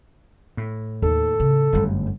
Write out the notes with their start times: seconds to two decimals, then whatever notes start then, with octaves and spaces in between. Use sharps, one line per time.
0.57 A2
1.02 D#2 A4
1.40 C#3
1.73 G1 F#2 G3 A3